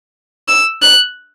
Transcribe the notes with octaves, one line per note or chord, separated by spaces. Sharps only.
E6
F#6